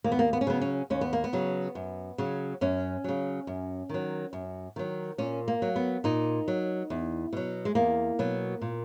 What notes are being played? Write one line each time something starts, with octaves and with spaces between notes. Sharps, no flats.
D#2 A#3
B3
A#3
B3
C#4
C#3 F#3 B3
C#4
D#2 C#4
B3
A#3
B3
C#3 F#3
F#2
C#3 F#3
F#2 C#4
C#3 F#3
F#2
D#3 F#3
F#2
D#3 F#3
A#2 C#4
A#3
F#3
B3
A#2 D#4
F#3
E2
B2 F#3
G#3
E2 A#3
B2 F#3
A#2